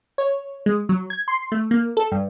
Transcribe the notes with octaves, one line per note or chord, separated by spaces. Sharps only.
C#5
G#3
F#3
G#6
C6
A3
A#3
A4
G2